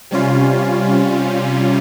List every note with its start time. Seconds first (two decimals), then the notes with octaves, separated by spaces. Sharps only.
0.11 C3 G3 C#4 F4